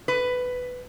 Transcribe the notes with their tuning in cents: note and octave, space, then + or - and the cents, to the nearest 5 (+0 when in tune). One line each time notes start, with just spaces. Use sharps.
B4 +10